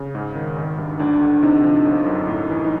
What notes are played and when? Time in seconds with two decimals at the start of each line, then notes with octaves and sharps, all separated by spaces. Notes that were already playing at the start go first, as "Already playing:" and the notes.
Already playing: C#3
0.15 G#2
0.35 D#3
0.56 G#1
0.78 G2
0.99 D2 D4
1.21 D3
1.42 C3 D#4
1.64 F3
1.85 G1
2.06 F#2
2.27 A2
2.49 E3
2.65 D#4